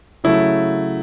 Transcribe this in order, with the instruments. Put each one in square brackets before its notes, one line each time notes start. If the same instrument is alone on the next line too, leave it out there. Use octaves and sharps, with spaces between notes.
[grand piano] C#3 F#3 A3 E4